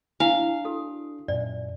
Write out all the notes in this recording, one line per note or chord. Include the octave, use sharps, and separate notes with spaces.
D4 E4 F5 G#5
F#4 A4
F#2 A#2 D5